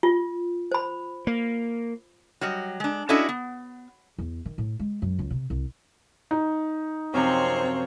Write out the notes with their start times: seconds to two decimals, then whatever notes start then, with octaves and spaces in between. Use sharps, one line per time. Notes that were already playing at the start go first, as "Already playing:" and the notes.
0.03 F4
0.72 C5 B5
1.27 A#3
2.41 F#3 G3 D#5
2.80 G#3 D4
3.09 C#4 D4 E4 F#4 A4 D#5
3.29 B3
4.19 E2
4.46 D#3
4.58 A2
4.79 G#3
5.02 F#2
5.19 C#2
5.30 C3
5.50 C2
6.31 D#4
7.14 F#2 C3 F3 C4 C5 C#5